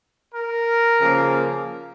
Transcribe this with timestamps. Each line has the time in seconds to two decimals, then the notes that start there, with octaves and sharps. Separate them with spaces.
0.35 A#4
0.99 C#3 F3 A#3